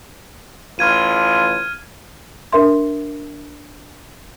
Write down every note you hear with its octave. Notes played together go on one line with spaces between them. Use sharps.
A1 F4 F6 G#6 D#7
D4 A#4 E5 C6